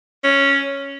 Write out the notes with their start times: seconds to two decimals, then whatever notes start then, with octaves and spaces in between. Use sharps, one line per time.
0.24 C#4